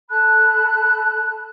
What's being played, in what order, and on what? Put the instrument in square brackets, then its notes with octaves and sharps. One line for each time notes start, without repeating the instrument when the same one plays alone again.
[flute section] A4 A5 B5 F#6